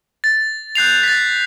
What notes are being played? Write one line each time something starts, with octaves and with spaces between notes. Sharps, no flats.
A6
F#6 G6 C7 F7
A6 B6